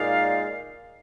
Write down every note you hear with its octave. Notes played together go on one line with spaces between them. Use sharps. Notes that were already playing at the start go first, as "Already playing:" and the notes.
Already playing: A#2 G#3 D#4 D5 F5